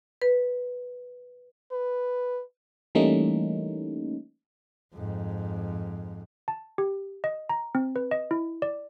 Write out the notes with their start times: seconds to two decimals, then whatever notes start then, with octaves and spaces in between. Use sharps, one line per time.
0.22 B4
1.72 B4
2.95 E3 G3 A3 A#3 C#4 D#4
4.94 F2 G#2
6.48 A5
6.78 G4
7.24 D#5
7.49 A#5
7.75 C4
7.96 B4
8.11 D#5
8.31 E4
8.62 D5